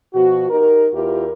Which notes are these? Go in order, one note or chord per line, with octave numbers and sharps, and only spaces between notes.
B2 F3 F#4
D#4 G4 A#4
E2 E4 F4 G4 A#4